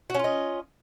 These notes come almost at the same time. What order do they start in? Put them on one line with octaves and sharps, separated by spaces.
F#4 C#4 F4 D#5